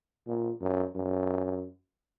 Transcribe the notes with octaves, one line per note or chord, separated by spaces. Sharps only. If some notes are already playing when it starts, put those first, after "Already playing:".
A#2
F#2
F#2